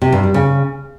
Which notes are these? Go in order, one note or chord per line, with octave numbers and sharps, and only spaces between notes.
C3
G2
G3
C#3